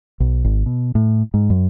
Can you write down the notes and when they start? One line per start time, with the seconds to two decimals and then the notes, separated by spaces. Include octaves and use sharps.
0.20 B1
0.44 G#1
0.66 B2
0.95 A2
1.34 G#2
1.50 F#2